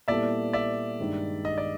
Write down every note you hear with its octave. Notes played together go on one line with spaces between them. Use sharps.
A#2 G3 B3 E4 A4 D5 E5
D5 E5
G2 D#3 G#3
D#5
D5